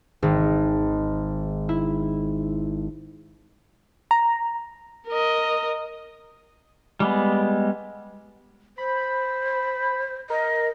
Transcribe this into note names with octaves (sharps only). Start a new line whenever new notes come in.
G#1
E4
A#5
A#4 D#5
G3 G#3 B3
C5 B5
A#4 D#5